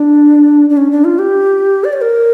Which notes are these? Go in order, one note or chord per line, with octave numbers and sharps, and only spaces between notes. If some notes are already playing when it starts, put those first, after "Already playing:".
Already playing: D4
D4
C#4
D4
F4
G4
D5
C#5
A#4